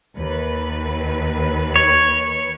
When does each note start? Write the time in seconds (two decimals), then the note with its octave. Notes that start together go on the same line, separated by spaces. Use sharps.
0.16 D#2 B4
1.76 C#5